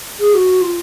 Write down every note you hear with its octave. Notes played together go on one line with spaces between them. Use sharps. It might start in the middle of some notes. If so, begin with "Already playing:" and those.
G#4
F#4
F4